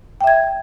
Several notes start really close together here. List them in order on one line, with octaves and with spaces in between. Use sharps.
G5 E5 G#6